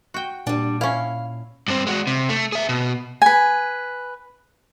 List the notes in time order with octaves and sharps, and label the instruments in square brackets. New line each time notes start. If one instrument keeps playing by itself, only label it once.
[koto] F#4 G5
[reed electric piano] A#2 [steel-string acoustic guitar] G3 D4
[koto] C#4 E4 [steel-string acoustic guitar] F5
[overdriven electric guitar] G2 C4
G#3 F#4
C3
A3
G#4 E5
B2
[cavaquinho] B4 G#5